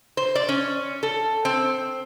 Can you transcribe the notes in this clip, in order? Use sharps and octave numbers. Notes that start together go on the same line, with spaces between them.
C5
D5
C#4
A4
C4